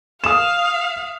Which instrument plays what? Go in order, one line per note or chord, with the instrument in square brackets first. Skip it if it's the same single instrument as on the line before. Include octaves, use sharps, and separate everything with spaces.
[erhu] F5 [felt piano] D#6 E7